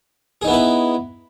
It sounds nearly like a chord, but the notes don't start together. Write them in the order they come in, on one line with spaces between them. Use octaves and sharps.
G#4 D#4 B3 E4 B4